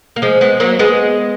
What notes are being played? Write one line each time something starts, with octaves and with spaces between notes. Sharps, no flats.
A#3
F3 G#3
G#3 B3
F#3 A#3
G#3 B3